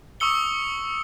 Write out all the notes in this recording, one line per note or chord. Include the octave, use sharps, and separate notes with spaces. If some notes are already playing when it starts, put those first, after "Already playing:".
C#6 D#6 E6 C#7 G7